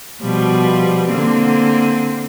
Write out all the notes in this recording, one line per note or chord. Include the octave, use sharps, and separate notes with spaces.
B2 F3 G3
D3 A#3 C4